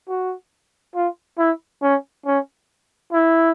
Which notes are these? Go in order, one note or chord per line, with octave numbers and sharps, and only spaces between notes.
F#4
F4
E4
C#4
C#4
E4